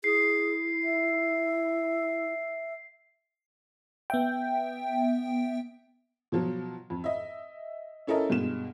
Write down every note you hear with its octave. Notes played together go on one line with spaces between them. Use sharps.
E4 G#4 C7
E5
B3 E5 G5
B2 F3 F#3
F2
D#5 E5
C#4 E4 A4 A#4 D#5
G2 B2 G#3 E7